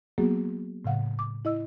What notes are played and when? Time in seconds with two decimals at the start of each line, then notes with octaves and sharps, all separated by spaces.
0.18 F#3 A#3 B3 F#4 G#4
0.85 A2 C#3 F5 F#5
1.19 D6
1.45 E4 D#5 E6